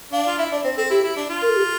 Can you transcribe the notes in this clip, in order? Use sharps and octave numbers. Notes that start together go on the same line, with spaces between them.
D4 F5
F4
E4 E5
D4 D5
C4 C5
C4 A4
E4 G4
E4
D4
F4
A#4
A4
G4